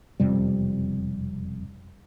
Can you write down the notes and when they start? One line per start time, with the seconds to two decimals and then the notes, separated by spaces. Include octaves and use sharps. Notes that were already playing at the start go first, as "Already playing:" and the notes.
0.20 E1 F2 C3 G3